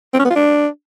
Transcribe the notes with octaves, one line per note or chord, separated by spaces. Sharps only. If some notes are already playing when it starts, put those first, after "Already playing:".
C4
C#4
B3
F4
D4